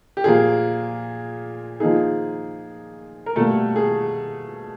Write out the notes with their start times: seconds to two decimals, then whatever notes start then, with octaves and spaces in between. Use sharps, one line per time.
0.17 G4
0.24 A#2 F3 A#3 G#4
1.80 F3 A#3 D#4 G#4
3.26 A#4
3.36 B2 G3 A3 A#3 A4
3.76 G#4